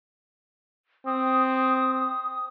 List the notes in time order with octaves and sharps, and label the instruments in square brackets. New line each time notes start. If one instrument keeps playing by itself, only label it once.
[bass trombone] C4 [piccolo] D#6